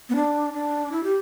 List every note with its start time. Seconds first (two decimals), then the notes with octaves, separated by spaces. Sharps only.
0.09 B3
0.16 D4
0.53 D4
0.92 E4
1.04 G4